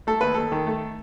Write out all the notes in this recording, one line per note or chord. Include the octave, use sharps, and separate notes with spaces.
A3 A4
D#2 B4
D#2 A4
D#3
A3